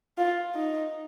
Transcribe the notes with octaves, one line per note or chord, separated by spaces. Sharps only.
F4
D#4